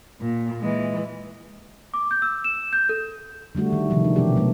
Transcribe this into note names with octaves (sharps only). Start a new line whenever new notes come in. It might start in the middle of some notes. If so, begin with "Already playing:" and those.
A#2
E3 G#3
D6
G6
E6
E7
G6
A4
D3 G3 A3 F#4
D#3
C3 D#3 F3 G#3
D4
B2 E3 F3 C#4 G4
F#3 A3